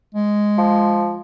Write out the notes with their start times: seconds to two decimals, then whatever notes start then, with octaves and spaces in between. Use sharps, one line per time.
0.15 G#3
0.58 F3